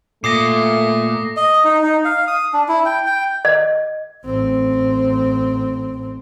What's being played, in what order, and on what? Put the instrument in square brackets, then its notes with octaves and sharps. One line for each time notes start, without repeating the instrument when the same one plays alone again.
[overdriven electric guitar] A#2 [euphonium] A3 [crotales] D6 A#6 [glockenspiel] D#6 C7
[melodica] D#5
D#4
D#4
F5
D#6
D4
E4
G5
G5
[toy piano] D#5
[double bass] A1 C4